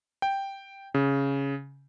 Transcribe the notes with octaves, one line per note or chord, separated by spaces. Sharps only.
G5
C#3